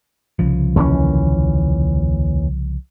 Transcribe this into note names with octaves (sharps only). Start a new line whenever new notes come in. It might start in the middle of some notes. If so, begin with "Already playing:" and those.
C2 C#3 F3
D#2 E3 C#4